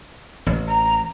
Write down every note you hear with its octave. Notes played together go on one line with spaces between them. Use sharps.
A1
A#5